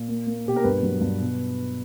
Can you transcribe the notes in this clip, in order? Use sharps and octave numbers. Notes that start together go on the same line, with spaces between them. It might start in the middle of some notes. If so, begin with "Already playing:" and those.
Already playing: A#2
A#3
A#3
B2 G4
A#4
G2 B4
F#3
G2
B2